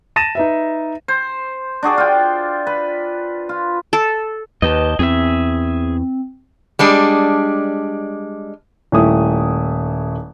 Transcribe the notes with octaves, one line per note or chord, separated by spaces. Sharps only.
A5 A6 A#6 D#7 E7
D#4 B4 E5
C5
D4 F#4 G#4 D5
F4 G5
B4
F4
A4
D#2 B4 D#5 G5 A5
E2 C4 G#4 E5
G3 G#3 D4
D#1 A3 E4 D#6